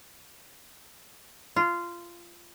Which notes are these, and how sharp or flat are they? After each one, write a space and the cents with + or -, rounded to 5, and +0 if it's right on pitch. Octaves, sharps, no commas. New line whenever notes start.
F4 -15